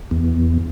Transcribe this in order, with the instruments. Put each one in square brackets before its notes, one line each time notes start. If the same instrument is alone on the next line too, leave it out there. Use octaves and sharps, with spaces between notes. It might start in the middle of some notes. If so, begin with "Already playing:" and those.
[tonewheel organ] E2